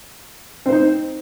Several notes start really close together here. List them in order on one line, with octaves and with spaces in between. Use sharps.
C4 C5 D#4